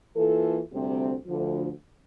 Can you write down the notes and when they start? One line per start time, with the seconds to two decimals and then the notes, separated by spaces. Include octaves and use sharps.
0.16 E3 A#3 F4 A4
0.71 D2 C3 G3 C4
1.26 D2 D3 F3